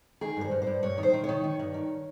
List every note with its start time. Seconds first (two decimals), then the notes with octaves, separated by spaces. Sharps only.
0.21 D#3 G#4
0.37 G2 C5
0.51 G2
0.62 C5
0.67 G2
0.83 G2 C#5
0.98 D#3
1.03 C5
1.13 D#3
1.24 C#5
1.29 D#3
1.44 D#3
1.59 G2
1.74 D#3